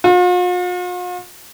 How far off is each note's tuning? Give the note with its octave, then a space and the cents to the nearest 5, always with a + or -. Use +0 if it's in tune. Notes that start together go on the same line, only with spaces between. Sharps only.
F4 +45